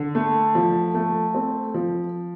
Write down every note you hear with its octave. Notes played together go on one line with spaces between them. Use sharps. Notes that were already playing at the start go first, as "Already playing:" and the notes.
Already playing: D3
A3
F3
A3
C4
F3